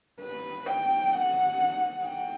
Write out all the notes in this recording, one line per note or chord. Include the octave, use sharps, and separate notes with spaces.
B4
G5
F#5
G5